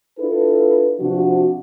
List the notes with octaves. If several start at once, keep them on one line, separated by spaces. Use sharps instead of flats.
D4 E4 F4 A4 B4
C3 F3 D4 F#4